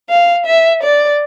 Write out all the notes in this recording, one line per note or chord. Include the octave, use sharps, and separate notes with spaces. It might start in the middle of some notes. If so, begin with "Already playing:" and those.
F5
E5
D5